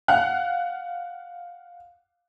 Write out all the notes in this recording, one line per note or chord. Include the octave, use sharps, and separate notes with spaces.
F5 F#5 F#6